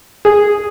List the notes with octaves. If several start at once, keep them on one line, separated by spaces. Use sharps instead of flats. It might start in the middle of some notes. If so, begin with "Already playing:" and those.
G#4